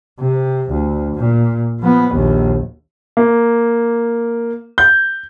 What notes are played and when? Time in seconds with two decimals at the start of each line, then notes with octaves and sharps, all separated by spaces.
0.21 C3
0.71 D2
1.15 A#2
1.80 F3 B3
2.15 A#1 D#2
3.17 A#3
4.78 G6